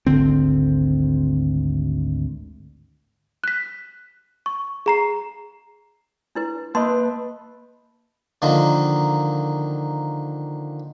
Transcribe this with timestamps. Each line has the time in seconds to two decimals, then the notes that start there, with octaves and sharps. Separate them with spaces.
0.06 G#1 D2 D3 C4
3.44 F#6 B6
4.46 C#6
4.86 G#4 A#5 C7
6.35 D4 E4 B4
6.75 A#3 B4 D#5 A5 C6
8.42 D3 D#3 F3 A#3 D#4 A#4